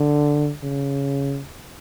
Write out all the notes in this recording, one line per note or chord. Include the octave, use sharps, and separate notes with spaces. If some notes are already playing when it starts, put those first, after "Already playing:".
Already playing: D3
C#3